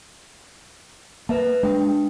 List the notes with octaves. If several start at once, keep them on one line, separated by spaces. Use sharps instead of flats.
A#3 B4 E5 A5
G#3 D4 G5